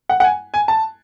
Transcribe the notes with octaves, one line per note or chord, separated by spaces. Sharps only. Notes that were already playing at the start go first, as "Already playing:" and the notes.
F#5
F#5
G#5
G#5
A5